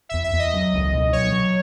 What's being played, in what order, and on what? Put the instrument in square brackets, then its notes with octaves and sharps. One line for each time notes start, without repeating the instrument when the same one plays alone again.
[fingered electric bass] E2 [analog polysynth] E5
[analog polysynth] E5
[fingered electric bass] E2
[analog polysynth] D#5
[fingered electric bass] F#3
C#2
B2
[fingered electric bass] F#3 [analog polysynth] C#5
[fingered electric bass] F#3